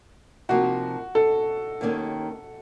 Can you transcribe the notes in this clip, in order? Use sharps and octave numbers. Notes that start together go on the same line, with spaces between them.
C3 F3 A#3 D#4 F#4
A4
D#2 D#3 A#3 C#4